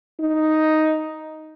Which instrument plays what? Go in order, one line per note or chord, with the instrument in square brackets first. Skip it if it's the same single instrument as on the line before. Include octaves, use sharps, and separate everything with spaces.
[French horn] D#4